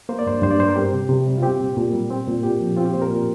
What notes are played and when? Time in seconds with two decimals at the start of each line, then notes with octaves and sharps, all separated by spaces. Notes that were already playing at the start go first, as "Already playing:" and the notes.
0.09 A#3 C5
0.19 D5
0.27 G2 C5
0.42 G2 C5
0.51 D5
0.59 G3 C5
0.68 A#4
0.76 C4 G4
0.93 C3
1.09 C3
1.27 G3
1.38 F4
1.43 C4 G4
1.60 A#2
1.77 A#2
1.93 G3
2.10 C4
2.27 A#2
2.43 A#2 G4
2.60 F3
2.77 C4 F4
2.85 G4
2.94 A#2 C5
3.02 A#4
3.10 A#2